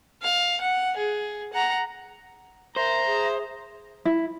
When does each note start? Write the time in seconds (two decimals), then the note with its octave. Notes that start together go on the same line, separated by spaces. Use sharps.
0.23 F5
0.61 F#5
0.97 G#4
1.53 F#5 A#5
2.76 A#4 C5 E5 A#5
3.06 G#4
4.05 E4